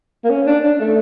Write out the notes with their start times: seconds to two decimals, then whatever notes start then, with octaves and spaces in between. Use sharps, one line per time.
0.24 A#3
0.30 C#4
0.46 D4
0.64 D4
0.80 A3